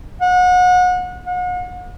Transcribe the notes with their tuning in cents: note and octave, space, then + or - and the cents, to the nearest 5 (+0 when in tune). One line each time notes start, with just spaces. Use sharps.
F#5 -30
F#5 -40